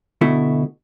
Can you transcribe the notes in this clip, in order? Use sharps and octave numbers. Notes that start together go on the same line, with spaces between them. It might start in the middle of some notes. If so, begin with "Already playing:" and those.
D2 B2 A3 E4